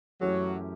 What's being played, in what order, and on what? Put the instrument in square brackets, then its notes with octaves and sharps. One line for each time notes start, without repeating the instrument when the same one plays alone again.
[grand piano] F#2 E3 A3 C#4 G4 [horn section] F#3